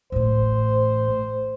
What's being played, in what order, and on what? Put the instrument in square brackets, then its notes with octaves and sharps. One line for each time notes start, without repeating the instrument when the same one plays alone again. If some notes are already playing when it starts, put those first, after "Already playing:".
[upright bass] A1 A2 [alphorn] C5